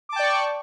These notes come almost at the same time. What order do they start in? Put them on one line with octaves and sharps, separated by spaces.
D6 A5 G5 D5 C#6